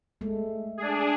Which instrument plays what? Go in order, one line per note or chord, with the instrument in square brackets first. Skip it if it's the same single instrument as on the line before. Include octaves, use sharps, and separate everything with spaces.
[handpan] G#3 A3
[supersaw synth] D4 G#4